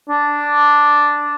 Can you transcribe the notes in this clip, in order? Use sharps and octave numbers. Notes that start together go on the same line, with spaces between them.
D4